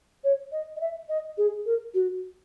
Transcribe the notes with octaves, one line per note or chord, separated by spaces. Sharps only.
C#5
D#5
D#5
E5
D#5
G#4
A#4
F#4